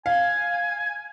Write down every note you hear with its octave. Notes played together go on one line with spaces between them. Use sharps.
F5 G#5